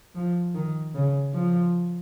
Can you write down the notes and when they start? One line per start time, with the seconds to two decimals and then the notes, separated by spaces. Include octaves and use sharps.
0.15 F3
0.54 D#3
0.95 C#3
1.34 F3